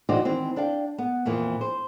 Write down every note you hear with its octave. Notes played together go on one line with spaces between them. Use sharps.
E3 D#4 F#4 G4 C5 D5
D#3 E3 C4
D4 D5 F5 G5
B3
F2 A#2 E3 F3
C5